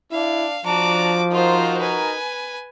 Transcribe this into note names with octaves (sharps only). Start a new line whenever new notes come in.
D4 E4 F5
F3 D4 F#4 A5 A#5 D6
D#4 F4 F#4 A#4 C5
B4 G#5